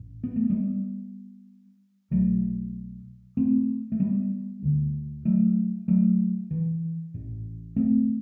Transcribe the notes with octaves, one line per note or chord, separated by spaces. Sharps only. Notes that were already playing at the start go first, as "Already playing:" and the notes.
Already playing: A1 A2
B3
A3
G3 B3
B1 B2 F#3 A3
A3 C4
A3
G3 B3
D2 D3
F#3 A3
F#3 A3
E3
A1 A2
A3 C4